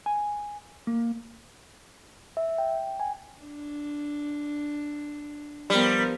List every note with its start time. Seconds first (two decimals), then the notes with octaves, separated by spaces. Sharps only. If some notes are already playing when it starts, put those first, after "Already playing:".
0.06 G#5
0.87 A#3
2.37 E5
2.58 G5
2.87 G5
3.00 G#5
3.40 D4
5.70 F3 G3 B3 A#4